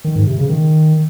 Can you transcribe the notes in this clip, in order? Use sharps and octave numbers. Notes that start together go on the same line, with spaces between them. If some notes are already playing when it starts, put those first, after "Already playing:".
D#3
G#2
C3
C#3
D#3